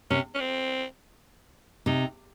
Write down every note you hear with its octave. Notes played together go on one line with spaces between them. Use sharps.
C3 C#4
C#4
C4
C3 D#4